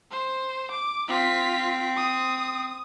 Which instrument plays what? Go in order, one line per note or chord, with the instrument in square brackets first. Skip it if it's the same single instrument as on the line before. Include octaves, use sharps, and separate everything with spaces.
[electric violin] C5
D6
[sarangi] C4 [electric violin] F4 B6
[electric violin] D#6